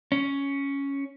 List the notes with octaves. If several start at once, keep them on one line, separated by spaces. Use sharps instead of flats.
C#4